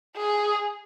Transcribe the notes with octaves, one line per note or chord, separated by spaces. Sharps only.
G#4